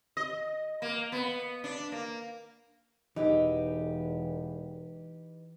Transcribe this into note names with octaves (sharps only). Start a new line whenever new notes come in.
D#5
A#3
B3
D4
A#3
E1 E3 D#4 G4 B4 D#5